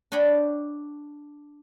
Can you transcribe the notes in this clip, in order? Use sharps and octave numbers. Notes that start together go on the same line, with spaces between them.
D4 C#5 D#5 G5 B5